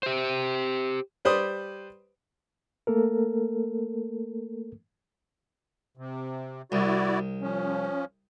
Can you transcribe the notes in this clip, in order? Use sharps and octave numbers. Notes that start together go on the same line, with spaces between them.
G4 C5
G3 B4 C5 D5 D#6
A3 A#3 A4 A#4
C3
C2 E4 F#4 D5
F3 C#4